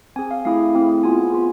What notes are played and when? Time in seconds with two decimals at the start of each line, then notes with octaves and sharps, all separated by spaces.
0.16 C4 G#4 G#5
0.31 F5
0.45 A3 C4 E4 G#4 F5
0.74 A3 C4 E4 G#4
1.03 B3 F4 G#4 G#5
1.18 G#5
1.32 B3 F4 G#4